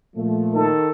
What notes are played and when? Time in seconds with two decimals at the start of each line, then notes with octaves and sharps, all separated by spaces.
0.16 A#2 F3 A3
0.54 D#3 A4